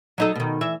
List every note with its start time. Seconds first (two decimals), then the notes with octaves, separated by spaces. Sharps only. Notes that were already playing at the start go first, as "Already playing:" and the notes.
0.18 F#3 D#4 A4
0.36 B2 D#3
0.61 E3 E5